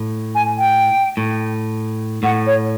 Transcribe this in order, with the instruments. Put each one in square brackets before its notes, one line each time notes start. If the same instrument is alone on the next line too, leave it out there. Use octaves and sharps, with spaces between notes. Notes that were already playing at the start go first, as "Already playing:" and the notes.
Already playing: [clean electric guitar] A2
[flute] G#5
G5
[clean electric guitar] A2
[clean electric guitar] A2 [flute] F#5
[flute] C#5